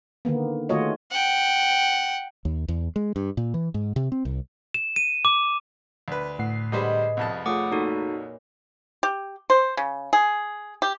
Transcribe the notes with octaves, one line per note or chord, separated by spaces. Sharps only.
D3 D#3 A#3 B3
D#3 A3 F4 F#4 C#5 D#5
G#4
F#5 G5
D#2
E2
G#3
G2
A#2
E3
G#2
C3
C4
C2
E7
D#7
D6
D2 B4
A2 F#5 C7
D3 G3 G#4 B4 C5 D#5
C2 F2 A5
A3 F4 G#4 C#5 F#5 D6 D#6
A#2 D#4 F#4 A4
G4
C5
C#3
G#4
G4